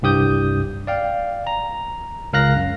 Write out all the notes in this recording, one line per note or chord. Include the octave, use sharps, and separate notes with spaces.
C2 G2 G4 D#6 G6
D5 F5 G5
A#5
C#2 A#4 F5 F#6 A#6
F#2